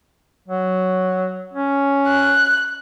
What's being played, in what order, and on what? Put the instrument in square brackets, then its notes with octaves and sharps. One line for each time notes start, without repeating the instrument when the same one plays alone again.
[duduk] F#3
C#4
[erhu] F#6